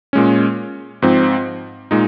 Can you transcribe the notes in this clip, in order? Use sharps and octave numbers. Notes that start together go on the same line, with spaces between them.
A#2 G#3 C#4
G#2 F3 C4
A#2 G#3 D#4